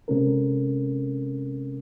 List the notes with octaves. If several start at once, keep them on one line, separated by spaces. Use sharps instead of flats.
C3 G#3 C4 C#4 A4 A#4